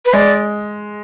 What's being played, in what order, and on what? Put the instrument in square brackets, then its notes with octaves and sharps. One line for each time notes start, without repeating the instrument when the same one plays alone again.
[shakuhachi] B4
[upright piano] G#3 [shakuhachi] D5